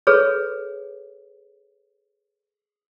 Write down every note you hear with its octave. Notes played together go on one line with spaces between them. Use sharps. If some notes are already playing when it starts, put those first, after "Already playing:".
G#4 A4 B4 C#5